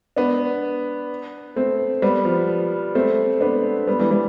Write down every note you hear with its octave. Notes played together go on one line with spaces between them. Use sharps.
B3 D4
A3 C4
G3 B3
F3
A3 C4
B3 D4
G3 B3
E3 G3
E3 G3